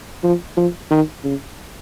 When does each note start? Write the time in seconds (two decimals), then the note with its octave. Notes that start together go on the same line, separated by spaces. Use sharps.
0.23 F3
0.57 F3
0.90 D#3
1.24 C#3